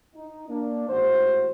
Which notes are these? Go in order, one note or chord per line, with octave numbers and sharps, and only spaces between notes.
D#4
A#3 D4
A1 G#2 G#3 F#4 C5